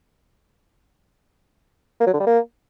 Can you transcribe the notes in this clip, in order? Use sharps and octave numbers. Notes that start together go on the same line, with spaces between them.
A#3
F#3
D3
G3
A#3